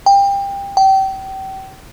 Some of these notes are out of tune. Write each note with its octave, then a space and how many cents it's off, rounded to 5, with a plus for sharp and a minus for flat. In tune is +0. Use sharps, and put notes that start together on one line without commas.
G5 +25
G5 -30